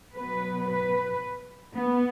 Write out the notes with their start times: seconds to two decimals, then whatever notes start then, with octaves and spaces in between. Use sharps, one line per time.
0.15 B2 F#3 B3 B4
0.68 B4
1.75 B3